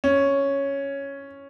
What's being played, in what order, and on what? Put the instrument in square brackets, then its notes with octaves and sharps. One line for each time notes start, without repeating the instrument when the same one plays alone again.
[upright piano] C#4